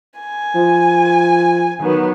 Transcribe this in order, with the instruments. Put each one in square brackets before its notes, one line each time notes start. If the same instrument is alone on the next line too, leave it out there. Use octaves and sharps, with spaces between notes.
[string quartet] G#5
[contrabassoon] F3
[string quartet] D#3 F#3 B3